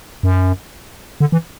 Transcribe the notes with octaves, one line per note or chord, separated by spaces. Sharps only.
F#2
D3
E3